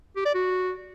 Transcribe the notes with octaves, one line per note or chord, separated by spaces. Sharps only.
G4
D5
F#4